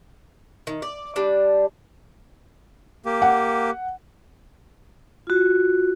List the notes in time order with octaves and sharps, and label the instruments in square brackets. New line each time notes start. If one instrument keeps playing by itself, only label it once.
[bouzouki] D#3
D5
G3 D4
[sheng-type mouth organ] A#3 G4
[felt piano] F#5
[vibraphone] F4 F#4